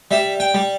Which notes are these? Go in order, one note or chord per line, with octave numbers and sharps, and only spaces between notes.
G3 E5
G5
G3